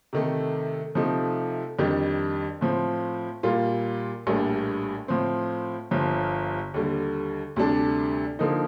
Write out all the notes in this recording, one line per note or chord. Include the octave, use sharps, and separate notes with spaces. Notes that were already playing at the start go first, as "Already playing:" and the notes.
C3 D#3 A3
C3 F3 A3 D#4
F2 D#3 G3 D4 G4
A2 F3 C4
A#2 G3 A#3 F4
A#1 A2 G3 A#3 D4
A2 F3 C4
G1 G2 F3
D#2 D3 G3
D2 C3 G3 D4 A4
D3 F3 A#3 D#4